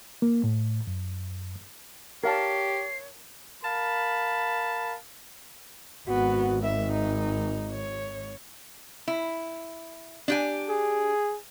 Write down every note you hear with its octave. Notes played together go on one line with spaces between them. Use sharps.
A#3
A2
F#2
G4 A#4 C#5 F5 A5 C7
A#4 F5 A5 B5
G#1 B3 F#4
D#3 E5
D#4
C#5
E4
D4 G4 G#5
G#4